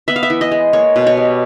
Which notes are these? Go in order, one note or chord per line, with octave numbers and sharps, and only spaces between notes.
B3 E5
F5
E5
E3
D#5
G#3
A#3 C#5
B2
C#5
G3